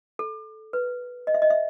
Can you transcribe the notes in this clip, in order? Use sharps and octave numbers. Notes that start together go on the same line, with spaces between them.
A4
B4
D#5
E5
D#5
E5